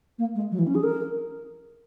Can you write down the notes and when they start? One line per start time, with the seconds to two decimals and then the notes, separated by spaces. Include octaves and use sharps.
0.18 A#3
0.35 G#3
0.51 F#3
0.59 E3
0.67 C#4
0.75 G#4
0.83 A#4